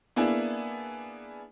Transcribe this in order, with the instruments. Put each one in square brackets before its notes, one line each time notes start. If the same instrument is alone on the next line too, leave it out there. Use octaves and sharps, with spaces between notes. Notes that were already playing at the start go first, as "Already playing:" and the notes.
[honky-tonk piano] A#3 B3 D4 E4 G#4